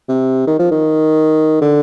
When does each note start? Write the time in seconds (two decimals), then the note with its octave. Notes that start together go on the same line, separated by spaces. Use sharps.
0.09 C3
0.47 D#3
0.59 F3
0.71 D#3
1.62 D3